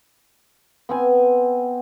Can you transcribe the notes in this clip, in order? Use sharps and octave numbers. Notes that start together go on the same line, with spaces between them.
B3 C4 G#5